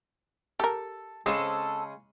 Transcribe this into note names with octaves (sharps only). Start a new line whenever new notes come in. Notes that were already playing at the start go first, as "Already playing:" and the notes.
G4 A4 A#4
C#3 G#3 C4 G#4 A4